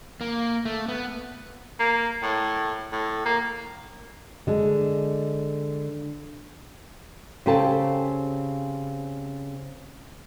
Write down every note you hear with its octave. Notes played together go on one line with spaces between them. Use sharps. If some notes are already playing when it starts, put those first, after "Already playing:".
A#3
A3
B3
A#3
A2
A2
A#3
D3 G#3
C#3 C4 G4 A4 A5